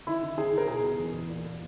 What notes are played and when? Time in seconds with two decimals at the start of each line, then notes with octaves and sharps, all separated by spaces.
0.07 D#3 E4
0.23 D#3
0.38 D#3 G#4
0.52 D#3
0.58 A#4
0.68 B2 G#4
0.83 B2
0.99 E2
1.13 E2
1.29 A#2
1.45 A#2